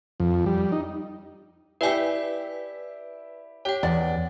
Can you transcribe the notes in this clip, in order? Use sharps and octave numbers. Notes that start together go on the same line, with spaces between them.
F2
G3
D#4
E4 G4 B4 D5 E5 G#5
G4 C#5 G5
E2 D5